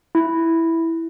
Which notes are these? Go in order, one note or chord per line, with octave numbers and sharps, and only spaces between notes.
E4